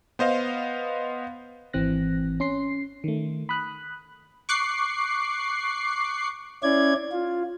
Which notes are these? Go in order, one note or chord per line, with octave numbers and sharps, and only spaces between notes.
B3 C5 D#5 F5
G#1 E3 C4 F#6 A#6
C#4 C6 C7
D#3 A3
B5 D#6 F#6
C#6 D6 F#6 C7
C#4 E4 D5 G#6
F4